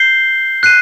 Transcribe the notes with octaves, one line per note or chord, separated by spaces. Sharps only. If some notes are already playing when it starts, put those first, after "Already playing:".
Already playing: G6 C7 G7
F#6 C7 D#7